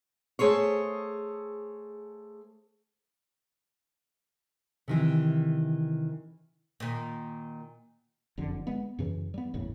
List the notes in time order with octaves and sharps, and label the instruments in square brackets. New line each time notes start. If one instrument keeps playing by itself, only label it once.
[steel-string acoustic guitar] A3 G#4 C5 C#5
[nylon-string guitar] C3 D#3 E3
[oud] A#2 D#3
[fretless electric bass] F#1 F2 D3
G#3 B3
F#2 C#3 E3
G3 B3
G1 E2 A2 C#3